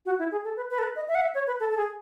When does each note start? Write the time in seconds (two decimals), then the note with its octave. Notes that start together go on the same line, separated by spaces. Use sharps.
0.06 F#4
0.19 E4
0.32 G#4
0.45 A4
0.57 B4
0.71 B4
0.79 A4
0.83 B4
0.96 D#5
1.08 E5
1.15 F#5
1.21 E5
1.34 C#5
1.47 B4
1.60 A4
1.70 A4
1.77 G#4